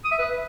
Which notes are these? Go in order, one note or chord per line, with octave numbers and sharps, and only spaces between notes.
D#6
E5
B4